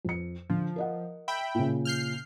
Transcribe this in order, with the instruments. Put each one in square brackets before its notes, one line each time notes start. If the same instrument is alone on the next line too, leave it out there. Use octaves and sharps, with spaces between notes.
[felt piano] F2 C#7
[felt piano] D3 [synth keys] F3
[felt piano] A#4 D#5 F#5
[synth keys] E5 G5 B5
[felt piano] A#2 C#3
[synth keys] F6 G6 C7